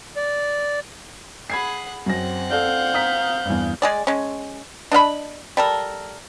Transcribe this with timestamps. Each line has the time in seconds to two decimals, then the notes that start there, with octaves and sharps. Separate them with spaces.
0.17 D5
1.50 G#4 F#5 B5 G#6 C7
2.06 F#2 C4 F#5 A#6
2.50 A4 D5 F5 G6
2.94 A#5 D#6 B6
3.46 E2 G2
3.82 G#3 G#4 D5
4.07 G#3 C#4
4.92 D4 D#5 F5 B5
5.57 G3 A4 A#4